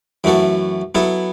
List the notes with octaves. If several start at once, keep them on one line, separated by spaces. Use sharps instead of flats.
F#2 E3 A3 F#4 A4
F#3 B3 E4 A4